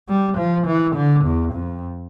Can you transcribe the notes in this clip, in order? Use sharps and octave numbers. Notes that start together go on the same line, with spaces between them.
G3
F3
E3
D3
E2
F2